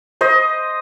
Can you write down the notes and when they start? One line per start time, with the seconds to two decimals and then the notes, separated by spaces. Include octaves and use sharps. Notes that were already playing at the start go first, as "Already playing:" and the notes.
0.21 C5 D#5